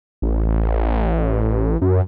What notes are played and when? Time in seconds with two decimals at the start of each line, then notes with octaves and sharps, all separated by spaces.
0.22 A1
1.82 F#2